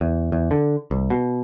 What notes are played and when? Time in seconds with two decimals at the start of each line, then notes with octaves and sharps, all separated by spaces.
0.01 E2
0.32 E2
0.51 D3
0.91 C2
1.10 B2